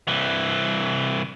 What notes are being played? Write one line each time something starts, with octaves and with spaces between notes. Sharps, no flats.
C2 E3